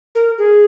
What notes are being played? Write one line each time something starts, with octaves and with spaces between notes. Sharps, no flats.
A#4
G#4